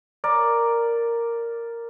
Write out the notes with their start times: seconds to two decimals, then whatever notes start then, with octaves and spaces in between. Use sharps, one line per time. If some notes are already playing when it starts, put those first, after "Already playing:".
0.24 A#4 D5